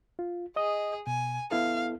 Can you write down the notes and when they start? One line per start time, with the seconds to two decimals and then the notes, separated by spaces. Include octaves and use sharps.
0.19 F4
0.56 G#4 D#5 D#6
1.07 B2 G#5
1.51 B3 E4 A4 F5